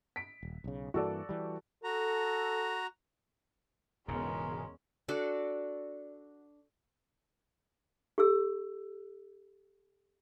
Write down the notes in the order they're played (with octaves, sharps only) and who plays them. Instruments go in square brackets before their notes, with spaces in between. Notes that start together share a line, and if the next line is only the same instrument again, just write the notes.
[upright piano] B6 D7
[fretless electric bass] D#1
B1 C#3
[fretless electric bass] G2 E3 A#3 [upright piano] F#4 A4 D5
[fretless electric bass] E3 G3
[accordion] F#4 A#5 [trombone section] A4
[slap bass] E1 G#2 C#3 [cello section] E2 [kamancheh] G#3 C#4 [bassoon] A#4
[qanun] D4 F#4 A4 D5
[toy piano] G4 A4 E6